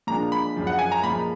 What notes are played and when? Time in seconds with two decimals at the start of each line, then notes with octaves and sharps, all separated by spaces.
0.07 A#2 F3 G#3 D4 A#5
0.32 B5
0.56 F#2 F3 G#3
0.67 F#5
0.79 G#5
0.92 A#5
1.04 A#2 F3 G#3 B5